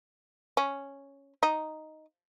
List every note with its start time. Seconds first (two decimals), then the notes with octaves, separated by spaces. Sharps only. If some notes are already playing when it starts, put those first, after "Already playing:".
0.57 C#4
1.43 D#4